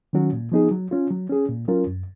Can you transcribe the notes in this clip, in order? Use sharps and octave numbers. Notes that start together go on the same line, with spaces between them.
D#3 F#3 C#4 F#4
A#2
F3 B3 D#4 G#4
F#3
C#4 F4
F#3
C#4 G#4
A#2
F#3 C#4 F4 A#4
F#2